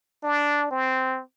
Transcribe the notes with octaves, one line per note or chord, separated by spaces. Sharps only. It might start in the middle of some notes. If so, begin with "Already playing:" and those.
D4
C4